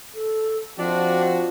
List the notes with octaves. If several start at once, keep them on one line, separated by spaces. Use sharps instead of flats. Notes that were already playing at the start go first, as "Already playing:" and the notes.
A4
F3 C4 D4 F#4 D5 D#5